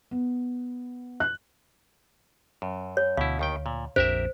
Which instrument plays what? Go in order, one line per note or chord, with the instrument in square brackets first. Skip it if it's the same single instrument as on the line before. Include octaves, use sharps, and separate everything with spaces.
[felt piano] B3
F#6
[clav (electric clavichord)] F#2
[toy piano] C#5
[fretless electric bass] D2 [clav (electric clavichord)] B2 E4 [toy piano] F5
[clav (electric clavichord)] D#2 D#3 G5
A#2
[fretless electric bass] A#1 F2 D4 [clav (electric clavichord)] G4 A#4 E5 [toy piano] C5